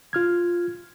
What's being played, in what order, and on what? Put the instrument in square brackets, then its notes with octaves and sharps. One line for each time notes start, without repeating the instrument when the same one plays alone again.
[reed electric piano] F4 F6 G#6